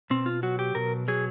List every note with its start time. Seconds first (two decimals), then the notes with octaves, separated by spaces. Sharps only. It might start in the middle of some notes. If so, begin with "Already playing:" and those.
0.10 B2 C4
0.26 F4
0.43 F#3 F#4
0.59 G4
0.75 B2 A#4
1.08 F#3 G#4